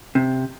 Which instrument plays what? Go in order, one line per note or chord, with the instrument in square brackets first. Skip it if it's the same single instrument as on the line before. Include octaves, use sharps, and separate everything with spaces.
[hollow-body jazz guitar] C3